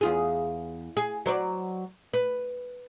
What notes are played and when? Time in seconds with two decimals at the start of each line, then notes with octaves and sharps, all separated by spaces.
0.01 E2 F4 G#4
0.97 G#4
1.26 F#3 C5 D5
2.14 B4